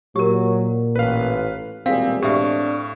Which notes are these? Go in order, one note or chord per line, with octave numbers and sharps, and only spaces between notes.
A#2 F#3 G4 A#4
A1 B4 F5
E1 A#2 G3 C4 G#4 F5
A2 C4 D4 G4 E5 F5 C#6